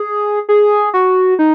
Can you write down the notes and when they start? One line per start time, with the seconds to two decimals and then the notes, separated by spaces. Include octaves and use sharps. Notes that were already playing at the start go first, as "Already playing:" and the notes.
Already playing: G#4
0.49 G#4
0.94 F#4
1.39 D#4